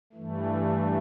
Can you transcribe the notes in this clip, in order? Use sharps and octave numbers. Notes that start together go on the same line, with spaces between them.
G2 E3 A3